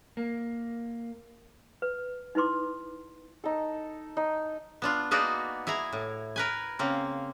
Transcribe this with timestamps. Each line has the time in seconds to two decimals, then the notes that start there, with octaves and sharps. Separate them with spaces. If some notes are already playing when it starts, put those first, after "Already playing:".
0.17 A#3
1.82 B4
2.35 D#4 E4 B4 C6 D6
3.44 D#4 A4
4.17 D#4
4.82 B3 D4 F4
5.11 A#3 B3 D#4 F#4 G#4 D5
5.67 E4 G#4 G#5 A#5
5.92 A2
6.36 A#4 B4 G#5
6.79 C#3 A#3 C4